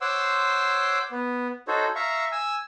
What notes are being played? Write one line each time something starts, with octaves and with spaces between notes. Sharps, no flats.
C5 C#5 F#5 C6 D6 E6
B3
D#4 F#4 A4 C5 C#5
E5 F5 A#5 C#6
G#5 E6